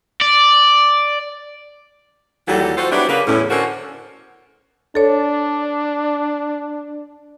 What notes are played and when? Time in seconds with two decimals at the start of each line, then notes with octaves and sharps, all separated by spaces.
0.22 D5
2.47 D#2 E3 F#3 G3 A4
2.77 F4 F#4 A4 C5
2.91 F#3 B3 D4 E4 G4 B4
3.09 C#3 A#3 B4
3.28 E2 A2 C#4
3.50 D3 C#4 F#4 A4 A#4 C5
4.95 D4 A4 C#5